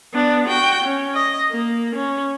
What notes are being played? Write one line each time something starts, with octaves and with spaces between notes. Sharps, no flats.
B3 D4
F#4 G5
C#4
D#5
A#3
C#4